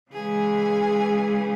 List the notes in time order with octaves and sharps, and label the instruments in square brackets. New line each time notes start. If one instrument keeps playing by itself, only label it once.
[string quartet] C#3 E3 G#3 G#4 G#5